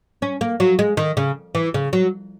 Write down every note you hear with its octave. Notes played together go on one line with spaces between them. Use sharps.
C#4
A#3
F#3
G#3
D#3
C#3
E3
C#3
F#3